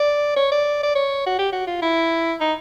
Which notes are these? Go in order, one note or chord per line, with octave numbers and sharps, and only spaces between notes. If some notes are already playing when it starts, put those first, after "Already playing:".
Already playing: D5
C#5
D5
D5
C#5
F#4
G4
F#4
F4
E4
D#4